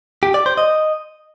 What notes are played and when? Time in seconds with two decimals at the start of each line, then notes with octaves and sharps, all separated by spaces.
0.23 G4
0.34 D5
0.46 C5
0.58 D#5